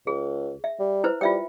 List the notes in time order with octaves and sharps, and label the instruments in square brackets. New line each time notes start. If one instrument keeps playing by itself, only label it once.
[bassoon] C#2 [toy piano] G#4
[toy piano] E5
[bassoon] G3
[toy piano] E4 B4 C5
[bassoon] G3 [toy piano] F4 E5 G5